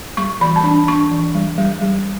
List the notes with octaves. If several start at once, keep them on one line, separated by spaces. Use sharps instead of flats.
G3 C#6
E3 B5
A5
D4 B5
D4 C#6
E3
G3
G3
G3